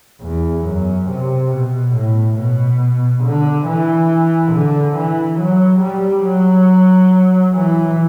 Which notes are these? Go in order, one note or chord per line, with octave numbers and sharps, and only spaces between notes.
E2
F#2
C3
B2
A2
B2
D3
E3
D3
E3
F#3
G3
F#3
E3